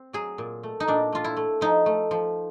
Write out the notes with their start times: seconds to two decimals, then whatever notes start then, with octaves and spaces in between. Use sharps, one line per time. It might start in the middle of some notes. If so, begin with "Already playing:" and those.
Already playing: C4
0.13 F#3 G#4
0.38 A#2
0.63 A3
0.80 D#4
0.88 A#2 D4
1.12 A3 F4
1.24 E4
1.37 A3
1.61 F3 D#4
1.86 A3
2.11 F3